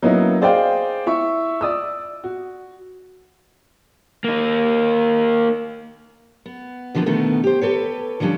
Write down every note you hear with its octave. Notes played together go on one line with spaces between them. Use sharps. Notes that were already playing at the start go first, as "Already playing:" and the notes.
F#3 A#3 B3 C#4 D#4 E4
G#4 C5 D5 D#5 F5 G5
E4 E5 C#6
D5 D#6 E6
F#4
A#3 D#4
B3
D3 E3 F3 A#3 B3
B2 D3 D#3 A3 B3
G4 C5
G4 A4 B4 C#5
D3 F3 G3 C#4 D4